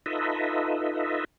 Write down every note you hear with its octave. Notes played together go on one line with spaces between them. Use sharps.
D#4 F4 A4 B4 D#5 E5